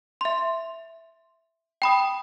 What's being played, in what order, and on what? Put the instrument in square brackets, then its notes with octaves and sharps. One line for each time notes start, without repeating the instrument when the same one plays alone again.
[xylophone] E5 C6
G5 B5 D#6